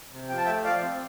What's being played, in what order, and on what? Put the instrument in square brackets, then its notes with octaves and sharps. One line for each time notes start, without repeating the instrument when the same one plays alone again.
[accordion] C3
F3 G5
A5
A3 E5 G5
F3 D5 F5
C4